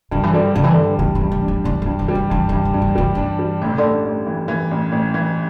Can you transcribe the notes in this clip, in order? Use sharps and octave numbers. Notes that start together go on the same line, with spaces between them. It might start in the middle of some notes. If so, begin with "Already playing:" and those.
G2 D3
E3
D3 G3
G2 D3
E3
G2 D3
G2 E3
E3
G2
E3
D4
E3
E3 D4
E3
G2
E3
G3
E3
G2 E3
E3
G2
E3
G2
E3
E3 G3
E3 D4
G3
A1 D3
C3
A1 D3
A1
E3
E3
A1
A1
E3